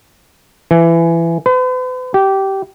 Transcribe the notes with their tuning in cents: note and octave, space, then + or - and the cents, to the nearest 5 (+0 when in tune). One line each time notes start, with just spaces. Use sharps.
E3 +20
B4 +45
G4 -15